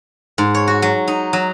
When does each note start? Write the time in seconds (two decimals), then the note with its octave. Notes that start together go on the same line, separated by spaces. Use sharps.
0.38 G#2
0.55 C#5
0.68 F#4
0.82 F#3
1.08 D#4
1.33 F#3